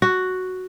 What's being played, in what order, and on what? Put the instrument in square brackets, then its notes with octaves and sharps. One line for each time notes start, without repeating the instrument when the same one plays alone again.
[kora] F#4